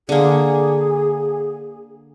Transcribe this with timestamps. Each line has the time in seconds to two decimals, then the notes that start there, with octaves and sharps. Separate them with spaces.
0.09 D3 A#3 G#4